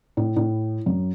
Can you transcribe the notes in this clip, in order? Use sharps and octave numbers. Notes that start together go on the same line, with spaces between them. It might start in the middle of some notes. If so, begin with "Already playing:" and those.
A2
A2
F#2